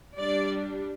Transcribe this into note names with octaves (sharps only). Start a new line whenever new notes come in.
G3 D4 D5